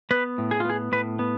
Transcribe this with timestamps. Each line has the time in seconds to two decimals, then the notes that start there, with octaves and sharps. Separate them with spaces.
0.11 B3 B4
0.38 A2
0.51 G#4
0.60 F4
0.65 B3 G#4
0.92 A2 B4
1.19 B3